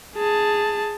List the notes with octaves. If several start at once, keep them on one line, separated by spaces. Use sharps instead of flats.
G#4 A5